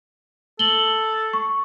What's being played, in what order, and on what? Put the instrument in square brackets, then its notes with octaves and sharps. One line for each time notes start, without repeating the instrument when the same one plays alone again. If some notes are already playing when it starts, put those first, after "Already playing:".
[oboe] A4 [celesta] F#7 G7
[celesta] C#6